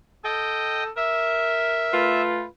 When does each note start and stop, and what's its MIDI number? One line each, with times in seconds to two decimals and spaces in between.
0.24 0.90 69
0.24 0.84 75
0.24 0.84 79
0.97 2.14 70
0.97 2.22 76
1.92 2.44 57
1.92 2.44 65
1.92 2.44 71